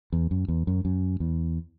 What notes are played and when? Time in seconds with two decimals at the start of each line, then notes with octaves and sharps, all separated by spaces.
0.12 E2
0.31 F#2
0.48 E2
0.67 F#2
0.85 F#2
1.20 E2